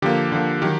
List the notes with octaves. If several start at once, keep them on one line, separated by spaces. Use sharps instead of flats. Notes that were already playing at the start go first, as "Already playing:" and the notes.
D3 F3 A#3 G4
D3 F3 A#3
D#3 F#3 G4